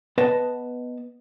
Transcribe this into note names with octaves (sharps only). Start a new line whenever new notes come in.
B3 B4 D#5 F#5 A5